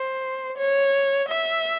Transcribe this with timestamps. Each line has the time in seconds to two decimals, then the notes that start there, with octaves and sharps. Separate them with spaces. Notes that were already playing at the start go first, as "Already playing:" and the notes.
Already playing: C5
0.58 C#5
1.29 E5